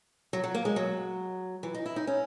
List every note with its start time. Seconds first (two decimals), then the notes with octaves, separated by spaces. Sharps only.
0.33 F#3
0.44 F#3
0.54 A#3
0.65 G#3
0.76 F#3
1.63 E3
1.74 D#4
1.86 E4
1.96 D#4
2.07 C#4